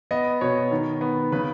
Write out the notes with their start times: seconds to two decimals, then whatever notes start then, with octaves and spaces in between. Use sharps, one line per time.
0.11 B3 D#5
0.41 B2 C#5
0.71 D#3
1.01 B3
1.32 C#3 B4